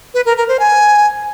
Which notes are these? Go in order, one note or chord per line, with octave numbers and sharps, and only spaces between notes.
B4
A#4
A#4
C5
G#5